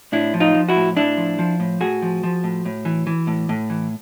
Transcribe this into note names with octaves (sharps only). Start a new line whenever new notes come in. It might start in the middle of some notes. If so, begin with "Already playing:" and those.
A2 D4 E4
F3
D#4 F4
F3
E4 F#4
A2
A2 D4 E4
F3
F3
A2
A2 F#4 G#4
F3
F3
A2
A2
E3
E3
A2
A2
E3